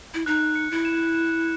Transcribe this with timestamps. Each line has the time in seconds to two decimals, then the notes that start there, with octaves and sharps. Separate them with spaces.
0.14 E4
0.26 D#4 F#6
0.55 C#7
0.71 E4
0.85 E7
1.14 E7